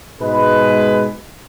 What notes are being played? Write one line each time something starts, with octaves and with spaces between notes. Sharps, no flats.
G#2 B2 G#3 G#4 B4